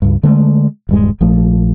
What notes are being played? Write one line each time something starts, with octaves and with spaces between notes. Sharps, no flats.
C#2 G2
D3 G#3 A3
D#1 G2 G#3
A#1 F3 A3